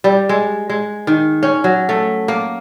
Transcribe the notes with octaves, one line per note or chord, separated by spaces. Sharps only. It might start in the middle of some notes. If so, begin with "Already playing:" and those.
G3
G#3
G#3
D#3
C#4
F#3
A3
A#3